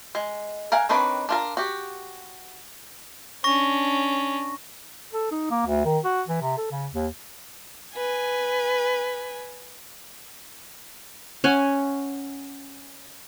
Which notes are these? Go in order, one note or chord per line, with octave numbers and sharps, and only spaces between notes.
G#3
A#4 F5 F#5 G#5
D#3 C4 D4 B4 C#5
D4 F4 A#4
F#4 G4
C#4 D4 C#6 A#6
A4
D#4
A#3
D2
D#3
F#4
E3
C3
A4
C#3
D#2
B4 G#5
C#4 F#5 G#5